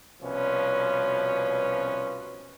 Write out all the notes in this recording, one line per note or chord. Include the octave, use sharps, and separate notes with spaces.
C2 B2 F3 C#4 B4